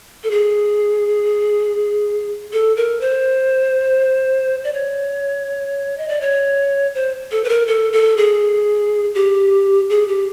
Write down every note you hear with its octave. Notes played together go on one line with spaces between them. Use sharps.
A4
G#4
A4
A#4
C5
D5
C#5
D#5
D5
C#5
C5
A4
B4
A#4
A4
A4
G#4
G4
G#4
G4